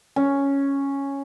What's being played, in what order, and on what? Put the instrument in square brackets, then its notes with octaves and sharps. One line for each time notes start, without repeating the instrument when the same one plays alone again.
[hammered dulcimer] C#4